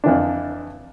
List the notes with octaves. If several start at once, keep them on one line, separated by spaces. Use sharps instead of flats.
F2 E3 D4